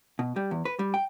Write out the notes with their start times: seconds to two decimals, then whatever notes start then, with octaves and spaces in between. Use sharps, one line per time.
0.19 B2
0.36 G3
0.51 E2
0.65 B4
0.79 G3
0.94 G5